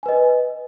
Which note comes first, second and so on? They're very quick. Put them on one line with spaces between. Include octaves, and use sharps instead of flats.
G#5 B4 D#5